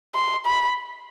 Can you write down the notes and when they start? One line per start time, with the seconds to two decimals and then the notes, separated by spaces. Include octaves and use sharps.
0.15 C6
0.46 B5